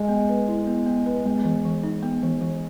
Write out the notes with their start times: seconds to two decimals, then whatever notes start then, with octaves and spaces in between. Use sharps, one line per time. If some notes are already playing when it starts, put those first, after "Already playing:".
Already playing: G#3
0.09 B3
0.29 B4
0.48 E4
0.67 B3
0.86 B3
1.06 B4
1.25 G#3 B3
1.44 E3
1.65 E3
1.83 D#4
2.03 B3
2.23 E3
2.41 E3